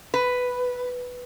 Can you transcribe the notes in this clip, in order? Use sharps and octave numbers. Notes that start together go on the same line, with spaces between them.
B4